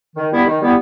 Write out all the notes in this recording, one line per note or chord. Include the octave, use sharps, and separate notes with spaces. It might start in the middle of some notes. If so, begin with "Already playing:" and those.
D#3
G3 B3 E4
D#3
G3 B3 E4